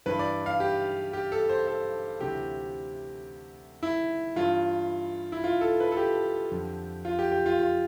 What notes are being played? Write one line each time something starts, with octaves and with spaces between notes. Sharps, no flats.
G2 E3 B4
D5
F5
G4
G4
A4
C5
A4
D2 C3 E3 G4
E4
G2 E3 F4
E4
F4
A4
B4
A4
G4
F2 D3
F4
G4
G4
F4
F4